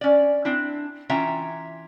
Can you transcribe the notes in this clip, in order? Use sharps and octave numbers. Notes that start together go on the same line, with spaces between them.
C#4 D5
C4 D4 E4
E3 C#4 F4 E5 G5 A#5